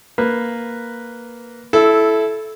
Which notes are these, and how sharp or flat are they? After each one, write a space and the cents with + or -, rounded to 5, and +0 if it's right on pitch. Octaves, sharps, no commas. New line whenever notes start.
A#3 +0 B4 +0
E4 +0 A4 -15